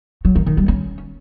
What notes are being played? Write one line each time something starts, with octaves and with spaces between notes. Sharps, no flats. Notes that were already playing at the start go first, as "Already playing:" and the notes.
F#3
D#3
D#3
G3
C#4